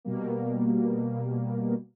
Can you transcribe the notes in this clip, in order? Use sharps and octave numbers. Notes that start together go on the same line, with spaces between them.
B2 G3 A#3